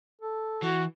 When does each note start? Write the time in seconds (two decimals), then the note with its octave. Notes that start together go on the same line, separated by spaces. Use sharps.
0.21 A4
0.63 E3 F#4